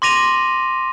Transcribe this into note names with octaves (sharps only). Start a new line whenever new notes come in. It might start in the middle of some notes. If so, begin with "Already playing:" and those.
C6 D6 A#6 D#7 F7